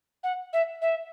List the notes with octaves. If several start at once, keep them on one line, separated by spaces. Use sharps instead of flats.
F#5
E5
E5